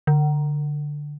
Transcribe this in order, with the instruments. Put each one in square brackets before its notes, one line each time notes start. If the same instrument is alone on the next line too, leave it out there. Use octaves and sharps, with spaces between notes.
[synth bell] D3